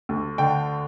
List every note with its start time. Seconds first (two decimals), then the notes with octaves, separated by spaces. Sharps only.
0.09 D2
0.38 D3 G5